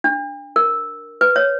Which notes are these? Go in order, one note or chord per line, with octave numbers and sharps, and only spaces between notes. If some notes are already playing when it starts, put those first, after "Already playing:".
D4
A#4
B4
C#5